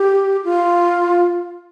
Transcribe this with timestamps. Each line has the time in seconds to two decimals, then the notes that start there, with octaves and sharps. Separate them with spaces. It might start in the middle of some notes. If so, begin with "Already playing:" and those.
Already playing: G4
0.45 F4